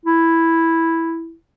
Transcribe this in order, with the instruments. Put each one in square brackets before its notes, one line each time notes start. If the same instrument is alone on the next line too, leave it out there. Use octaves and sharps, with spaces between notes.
[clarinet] E4